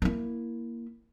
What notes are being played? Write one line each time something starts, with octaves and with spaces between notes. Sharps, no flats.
A#3 E4